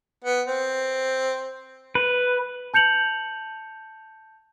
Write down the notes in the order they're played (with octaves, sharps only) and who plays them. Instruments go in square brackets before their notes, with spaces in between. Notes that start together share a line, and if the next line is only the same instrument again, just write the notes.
[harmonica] B3
C4
[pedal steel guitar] B4
[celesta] A5 G6 C#7 F7 F#7